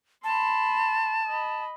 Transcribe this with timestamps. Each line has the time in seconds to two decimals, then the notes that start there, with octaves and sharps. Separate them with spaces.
0.24 A5 B5 C6
1.27 D#5 B5